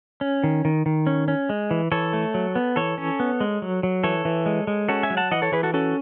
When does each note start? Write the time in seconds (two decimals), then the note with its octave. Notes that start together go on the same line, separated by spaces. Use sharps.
0.21 C#4
0.44 D#3
0.65 D#3
0.86 D#3
1.07 C#4
1.28 C#4
1.49 G#3
1.71 E3
1.91 E3 A4 C#5
2.13 A3
2.34 F#3
2.55 B3
2.76 E3 A4 C#5
2.98 C#4
3.20 B3
3.40 G#3
3.62 F#3
3.83 F#3
4.04 E3 A4 C#5
4.25 E3
4.46 G#3
4.67 G#3
4.89 C#4 F#4 A4
5.03 E5 G#5
5.10 F#3
5.17 F#5 A5
5.31 E3 D#5 F#5
5.42 A4 C#5
5.52 E3 G#4 B4
5.63 F#4 A4
5.74 C#4 F#4 A4